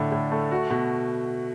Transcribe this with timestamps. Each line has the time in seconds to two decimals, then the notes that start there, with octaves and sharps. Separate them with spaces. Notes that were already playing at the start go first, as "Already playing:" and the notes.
Already playing: A2 D3 E4
0.12 A2
0.32 A3
0.51 F#4
0.70 B2